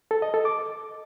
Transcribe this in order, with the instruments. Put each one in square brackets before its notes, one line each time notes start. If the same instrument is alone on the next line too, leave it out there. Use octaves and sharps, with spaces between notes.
[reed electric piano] A4
D#5
A4
D6